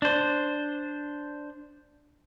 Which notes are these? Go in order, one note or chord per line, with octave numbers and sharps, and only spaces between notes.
D4 C5